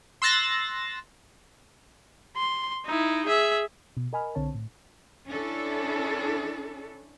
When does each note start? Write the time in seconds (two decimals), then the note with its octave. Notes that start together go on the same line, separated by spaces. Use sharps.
0.22 C6 E6 F#6 A6 A#6
2.37 C6
2.86 D#4 E4
3.27 G#4 E5
3.97 B2
4.13 A#4 D#5 G#5 B5 F6
4.35 B1 D3 C4 C#5 A5
4.55 A2
5.27 C#4 D4 E4 A4